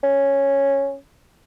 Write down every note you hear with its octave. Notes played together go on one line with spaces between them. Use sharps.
C#4